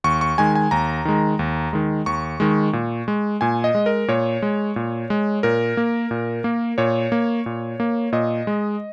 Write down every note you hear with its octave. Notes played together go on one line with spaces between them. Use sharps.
D#2 C#6
C#6
D#3 G#3 G#5
G#5
D#2 A#5
D#3 G#3
D#2
D#3 G#3
D#2 C#6
D#3 G#3
A#2
G#3
A#2 G#5
D#5
G#3
A#4
A#2 C#5
G#3
A#2
G#3
A#2 A#4
A#3
A#2
A#3
A#2 C#5
A#3
A#2
A#3
A#2 D#5
G#3